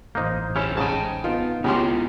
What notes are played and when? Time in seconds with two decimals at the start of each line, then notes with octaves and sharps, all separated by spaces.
0.15 A1 A#3 D#4 C5 G6
0.56 C#4 E4 G4 A4 C#5
0.77 G#2 C#3 G5 A5
1.24 B3 D#4 F4
1.64 C#2 C#3 B3 C#4 E4 F4 G4 C6